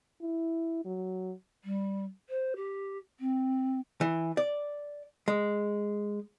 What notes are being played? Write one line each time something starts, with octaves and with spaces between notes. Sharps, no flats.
E4
F#3
G3
C5
G4
C4
E3
D5
G#3